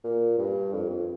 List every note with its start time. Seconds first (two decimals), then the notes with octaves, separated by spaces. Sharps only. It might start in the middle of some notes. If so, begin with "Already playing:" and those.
0.04 A#2
0.38 G2
0.73 F2
0.90 F2